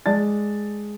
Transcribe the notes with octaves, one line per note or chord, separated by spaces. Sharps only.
G#3 D5 A5 A6